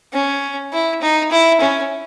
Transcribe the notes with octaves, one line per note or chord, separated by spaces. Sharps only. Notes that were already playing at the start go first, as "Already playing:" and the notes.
C#4
E4
D#4
E4
C#4